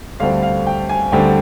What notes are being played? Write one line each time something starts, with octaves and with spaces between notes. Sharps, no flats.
D2 D3 G3 C4 F5
F5
G5
G#5
D2 D3 G3 C4 G5